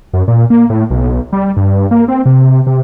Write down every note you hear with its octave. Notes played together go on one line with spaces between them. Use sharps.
F#2
A#2
A#3
A2
B1
G3
G2
A#3
C4
C3
C3